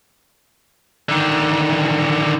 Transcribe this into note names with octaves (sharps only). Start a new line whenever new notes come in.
D3 D#3